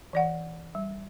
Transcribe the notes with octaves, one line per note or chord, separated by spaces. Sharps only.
E3 D5 F#5
G3